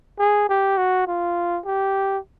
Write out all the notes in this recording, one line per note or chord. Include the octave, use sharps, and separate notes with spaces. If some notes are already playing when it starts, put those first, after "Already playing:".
G#4
G4
F#4
F4
G4